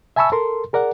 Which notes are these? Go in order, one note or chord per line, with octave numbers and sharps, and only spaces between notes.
E5 G#5 A5 B5 C#6 E6
A4 A#4 C6
G#4 A#4 D5 F#5